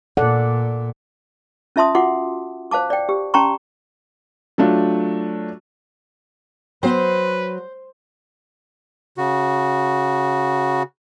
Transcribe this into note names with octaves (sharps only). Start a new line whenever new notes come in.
A#2 A4 D5 F#5
C#4 F4 E5 A5 C6 D#6
F4 F#4 F#5 C6 D6
C5 F5 A5 D6
D5 G5
G4
C#4 G5 A5 A#5 C6 C#6
F#3 A3 D4 F4
F#3 B3 F#4 B4 C5 G5
C#3 F#4